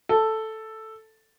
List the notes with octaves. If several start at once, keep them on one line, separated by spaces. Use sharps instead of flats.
A4